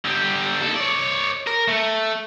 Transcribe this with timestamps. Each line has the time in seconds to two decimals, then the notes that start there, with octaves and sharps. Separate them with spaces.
0.05 D3 G4
0.60 D#2 A4
0.76 C#5 D5
1.47 A#4
1.68 A3